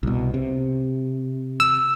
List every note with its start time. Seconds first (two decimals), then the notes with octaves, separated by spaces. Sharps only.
0.03 C2 B2
0.34 C3
1.60 E6